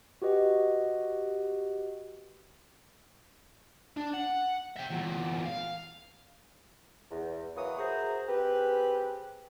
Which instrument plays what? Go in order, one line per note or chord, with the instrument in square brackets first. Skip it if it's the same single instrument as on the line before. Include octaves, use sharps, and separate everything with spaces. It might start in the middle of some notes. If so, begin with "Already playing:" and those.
[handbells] F#4 G4 B4 D#5
[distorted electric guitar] D4
F#5
E5 G5
E2 A#2
F5
[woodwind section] E2
E3 F#3 A#3 B4 C#5 D#6
F#4 G#4 A#4 C5 E5 A#5
C4 G4 G#4 B4